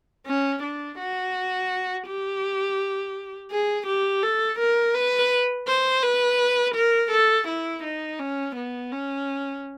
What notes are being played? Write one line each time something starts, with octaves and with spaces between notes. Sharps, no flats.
C#4
D4
F#4
G4
G#4
G4
A4
A#4
B4
C5
B4
A#4
A4
E4
D#4
C#4
B3
C#4